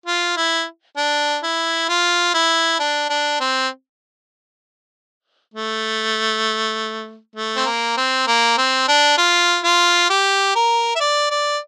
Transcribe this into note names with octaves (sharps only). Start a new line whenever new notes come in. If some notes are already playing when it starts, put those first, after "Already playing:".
F4
E4
D4
E4
F4
E4
D4
D4
C4
A3
A3
C4
A#3
C4
A#3
C4
D4
F4
F4
G4
A#4
E5
D5
D5